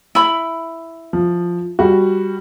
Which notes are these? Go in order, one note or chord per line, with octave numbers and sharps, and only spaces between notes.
E4 B5
F3
G3 F#4